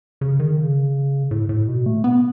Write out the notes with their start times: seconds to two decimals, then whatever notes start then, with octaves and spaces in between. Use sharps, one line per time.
0.21 C#3
0.39 D#3
0.57 C#3
1.31 A2
1.49 A2
1.68 B2
1.86 A3
2.04 B3